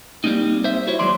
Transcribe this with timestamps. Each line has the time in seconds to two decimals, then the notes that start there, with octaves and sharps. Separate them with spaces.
0.24 G3 A#3 C4 D#4
0.64 C5 E5
0.87 E4 F#4 C5 C#5
0.99 D#2 F#3 G#3 D5 C6